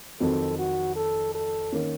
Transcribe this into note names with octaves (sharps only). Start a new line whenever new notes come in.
F2 D#3 F#3 C4 A4
F#4
A4
A4
D#3 A#3 C#4